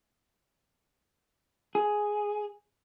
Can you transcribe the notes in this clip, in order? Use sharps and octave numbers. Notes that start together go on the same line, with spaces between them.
G#4